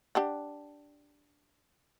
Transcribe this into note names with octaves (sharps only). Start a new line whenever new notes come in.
D4 G4 F#5